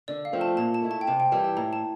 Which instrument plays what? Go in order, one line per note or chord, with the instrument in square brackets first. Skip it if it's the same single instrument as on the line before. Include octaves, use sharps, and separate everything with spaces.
[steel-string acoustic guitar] D3 [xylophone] D5
[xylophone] F5
[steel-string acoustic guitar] F3 A3 C4
[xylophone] A5
[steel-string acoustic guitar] A#2 [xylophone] A5
[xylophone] A5
[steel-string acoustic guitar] A3 E4
[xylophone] A5
G5
[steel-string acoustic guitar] C3 [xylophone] A5
[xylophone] G5
[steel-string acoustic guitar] E3 G3 [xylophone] A5
[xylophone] A5
[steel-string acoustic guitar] A2 [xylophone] A#5
[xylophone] A5